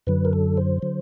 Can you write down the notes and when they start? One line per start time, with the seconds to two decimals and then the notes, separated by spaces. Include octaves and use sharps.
0.07 F#2 D3 F#3 B4
0.25 A#4
0.33 A4
0.57 C5
0.82 D3 F#3